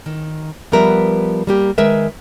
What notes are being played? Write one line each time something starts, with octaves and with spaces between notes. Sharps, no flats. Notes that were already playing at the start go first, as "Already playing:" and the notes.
D#3
F3 G3 B3 A#4 B4 E5
G3 A#3 G4
D#3 G#3 A#4 B4 E5